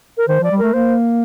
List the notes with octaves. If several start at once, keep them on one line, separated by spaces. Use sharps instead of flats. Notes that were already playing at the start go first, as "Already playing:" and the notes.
A#4
D#3 C5
F3 D5
G3
A3 A#4
A#3 C5